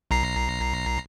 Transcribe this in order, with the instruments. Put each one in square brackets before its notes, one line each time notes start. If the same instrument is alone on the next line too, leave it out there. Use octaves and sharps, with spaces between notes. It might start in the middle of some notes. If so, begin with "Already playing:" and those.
[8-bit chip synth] B1 A#5 C7